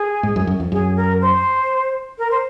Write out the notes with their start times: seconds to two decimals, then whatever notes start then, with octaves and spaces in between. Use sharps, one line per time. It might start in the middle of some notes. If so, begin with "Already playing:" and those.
Already playing: G#4
0.23 G#2
0.36 F#2
0.47 F#2
0.60 F2
0.72 F#2 G#4
0.96 A#4
1.21 C5
2.18 A#4
2.31 C5